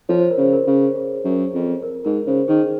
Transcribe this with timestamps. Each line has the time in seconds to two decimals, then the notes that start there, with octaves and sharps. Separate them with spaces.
0.09 F3 C#5
0.19 C5
0.31 A#4
0.38 C#3 C5
0.53 A#4
0.67 C#3
0.96 G#4
1.25 F#2
1.54 F2
1.83 A#4
2.04 G#2 A#4
2.27 C#3 C5
2.48 D#3 G#4